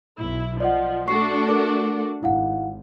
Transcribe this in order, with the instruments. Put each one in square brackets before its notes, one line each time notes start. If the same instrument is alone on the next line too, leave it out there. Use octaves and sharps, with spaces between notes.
[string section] B1 E4
[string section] F3 [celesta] D5 D#5 F#5
[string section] A3 D4 F#4 [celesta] C#6 C7
[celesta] A4 A#4 D6
[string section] G#1 [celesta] E4 F5 F#5